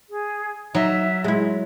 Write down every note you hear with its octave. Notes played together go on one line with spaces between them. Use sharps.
G#4
F#3 D#4 E5
G#3 E4